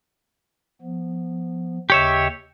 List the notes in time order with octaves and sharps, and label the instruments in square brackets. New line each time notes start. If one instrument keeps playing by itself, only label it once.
[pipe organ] F3 B3
[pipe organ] D#2 C#3 D#5 [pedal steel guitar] G4 C#5 E5